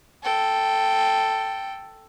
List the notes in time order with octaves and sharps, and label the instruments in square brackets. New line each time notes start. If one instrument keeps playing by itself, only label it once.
[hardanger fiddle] A4 G5